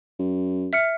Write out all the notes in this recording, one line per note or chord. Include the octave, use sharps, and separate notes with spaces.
F#2
E5 F6 C#7